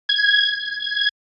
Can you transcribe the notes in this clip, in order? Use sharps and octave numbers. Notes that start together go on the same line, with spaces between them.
G#6